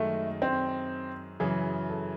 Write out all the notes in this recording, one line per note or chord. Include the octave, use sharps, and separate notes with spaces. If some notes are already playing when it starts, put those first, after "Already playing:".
Already playing: F#2 D#3 G#3 A3
C4
F#2 C#3 E3 G#4
A4